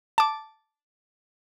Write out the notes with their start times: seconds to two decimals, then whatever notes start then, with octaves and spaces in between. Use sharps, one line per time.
0.18 A5 D6